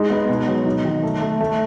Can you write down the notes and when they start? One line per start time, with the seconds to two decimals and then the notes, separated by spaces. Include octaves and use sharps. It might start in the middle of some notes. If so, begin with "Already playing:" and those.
Already playing: G#3 D#4
0.10 B3
0.29 B2
0.47 F#3
0.66 D#4
0.85 D#3
1.03 A3
1.21 A3
1.40 A3